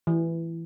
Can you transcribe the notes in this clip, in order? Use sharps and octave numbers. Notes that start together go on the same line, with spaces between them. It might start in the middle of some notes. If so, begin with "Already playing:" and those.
E3